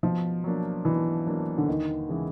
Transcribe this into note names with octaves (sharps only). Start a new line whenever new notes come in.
B2 F3
F#3 A#3 D4
B2 E3
F#3 A#3 D4
D3
D#2 D#3
C#3 E3 G#3